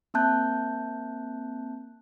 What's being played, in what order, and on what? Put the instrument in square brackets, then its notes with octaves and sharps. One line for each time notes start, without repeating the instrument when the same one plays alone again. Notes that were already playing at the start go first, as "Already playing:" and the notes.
[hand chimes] A#3 C4 E5 A5 F#6 G6